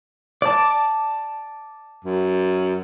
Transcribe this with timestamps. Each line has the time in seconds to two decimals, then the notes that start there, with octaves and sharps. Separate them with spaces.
0.42 D5 A5
2.05 F#2